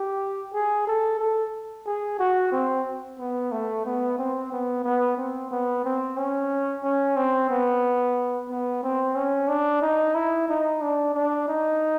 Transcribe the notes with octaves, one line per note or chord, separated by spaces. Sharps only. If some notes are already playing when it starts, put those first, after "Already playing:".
Already playing: G4
G#4
A4
A4
G#4
F#4
C4
B3
A3
B3
C4
B3
B3
C4
B3
C4
C#4
C#4
C4
B3
B3
C4
C#4
D4
D#4
E4
D#4
D4
D4
D#4